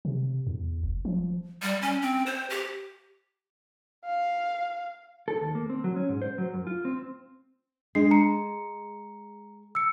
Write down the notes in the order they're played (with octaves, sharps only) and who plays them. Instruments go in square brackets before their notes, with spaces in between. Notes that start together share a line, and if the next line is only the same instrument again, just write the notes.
[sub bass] C3
E2
F1
F3
[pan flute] G3
C#4
C4
C5
G4
[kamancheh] F5
[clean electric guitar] A4
D#2
A#3
C4
F#3
C#4
G#2
C5
F#3
F#2
F4
C4
[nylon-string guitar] G#3 [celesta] D4 C7
[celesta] A#5 C#7
E6 C#7